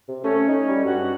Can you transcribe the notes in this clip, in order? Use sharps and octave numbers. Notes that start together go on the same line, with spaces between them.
C3
A3 C#4
D#4
G3
G2 F#4